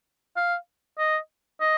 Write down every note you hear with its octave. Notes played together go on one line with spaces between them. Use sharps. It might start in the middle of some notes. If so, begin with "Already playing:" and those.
F5
D#5
D#5